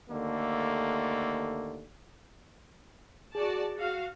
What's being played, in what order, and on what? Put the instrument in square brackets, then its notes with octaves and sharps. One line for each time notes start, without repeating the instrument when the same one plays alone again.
[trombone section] D#2 D3 A3 A#3
[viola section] F#4 D5 A5 [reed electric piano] G#4
[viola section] F#4 F5